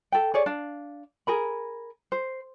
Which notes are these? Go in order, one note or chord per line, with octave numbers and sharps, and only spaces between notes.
A4 G5
G#4 C#5 D5
D4 F5
G#4 A#4 B5
C5